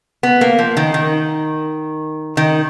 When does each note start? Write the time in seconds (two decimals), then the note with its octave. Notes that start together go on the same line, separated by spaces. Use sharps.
0.23 B3
0.41 A#3
0.59 F3
0.77 D#3
0.94 D#3
2.37 D#3